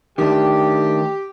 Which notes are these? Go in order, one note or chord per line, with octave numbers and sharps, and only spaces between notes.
D#3 A3 D4 G4